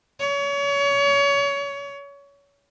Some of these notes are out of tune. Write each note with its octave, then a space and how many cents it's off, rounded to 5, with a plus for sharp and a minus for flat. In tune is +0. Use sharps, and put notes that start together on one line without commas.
C#5 +30